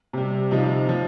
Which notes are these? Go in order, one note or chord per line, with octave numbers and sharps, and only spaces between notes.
C3 G3
C3 F3 D#4
F3